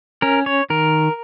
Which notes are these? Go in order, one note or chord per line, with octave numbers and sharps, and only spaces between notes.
C#4 A#4
C#5
D#3 A#4